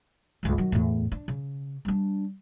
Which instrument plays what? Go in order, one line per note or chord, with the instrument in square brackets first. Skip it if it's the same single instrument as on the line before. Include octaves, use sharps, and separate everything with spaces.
[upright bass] C#2 G2
D#3 F#3
E2 A2
D4
C#3
G3 D4